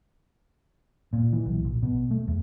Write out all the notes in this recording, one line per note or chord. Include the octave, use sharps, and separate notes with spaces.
A#2
E3
B1
A#1
B2
A3
E2